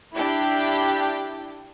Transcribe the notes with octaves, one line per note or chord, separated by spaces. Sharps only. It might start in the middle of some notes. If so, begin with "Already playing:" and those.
D4 E4 G4 G5